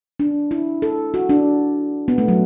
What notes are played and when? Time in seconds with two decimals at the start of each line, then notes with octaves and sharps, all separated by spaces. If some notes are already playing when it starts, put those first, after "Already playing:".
0.20 D4
0.51 E4
0.82 A4
1.14 F#4
1.29 D4
2.08 B3
2.18 A3
2.28 F#3